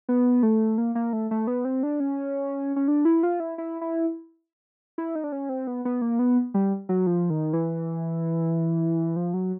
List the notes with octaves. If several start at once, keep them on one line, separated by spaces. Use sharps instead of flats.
B3
A3
A#3
A#3
A3
A3
B3
C4
D4
C#4
C#4
D4
E4
F4
E4
E4
E4
E4
D#4
D4
C#4
C4
B3
B3
A#3
B3
G3
F#3
F3
D#3
E3
F3
F#3